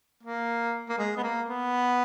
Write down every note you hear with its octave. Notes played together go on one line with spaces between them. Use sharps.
A#3
A#3
G#3
B3
A#3
B3